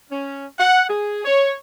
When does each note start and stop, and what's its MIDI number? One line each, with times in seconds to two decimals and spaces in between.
0.11 0.47 61
0.59 0.89 78
0.90 1.24 68
1.25 1.54 73